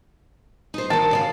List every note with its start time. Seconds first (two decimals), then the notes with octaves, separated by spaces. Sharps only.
0.74 D#4 C5
0.90 D#3 A#3 A5
1.11 C#3 D5 F5